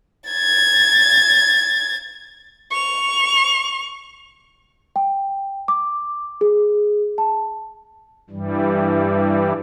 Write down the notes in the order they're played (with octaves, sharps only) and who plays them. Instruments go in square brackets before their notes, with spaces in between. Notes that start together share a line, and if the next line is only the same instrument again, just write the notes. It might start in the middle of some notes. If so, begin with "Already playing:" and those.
[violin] G#6 A6
C#6 F7
[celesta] G5
D6
G#4
A5
[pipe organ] G2 E3 G3